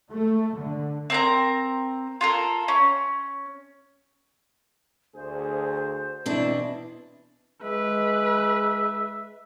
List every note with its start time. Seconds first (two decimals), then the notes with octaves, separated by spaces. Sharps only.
0.12 A3
0.56 D3
1.10 C4 A#4 A#5
2.21 F4 A4 A#4
2.68 C#4
5.15 D2 G#4 C5
6.26 E2 B2 C4 D4 E4
7.63 G#3 B4 E5